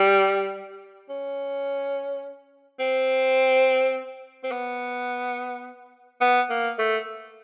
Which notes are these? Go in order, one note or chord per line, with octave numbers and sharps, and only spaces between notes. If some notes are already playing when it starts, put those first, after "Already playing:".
Already playing: G3
C#4
C4
C4
B3
B3
A#3
A3